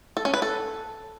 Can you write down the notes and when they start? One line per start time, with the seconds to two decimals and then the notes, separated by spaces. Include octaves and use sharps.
0.17 A4
0.25 C#4
0.34 B4
0.42 A4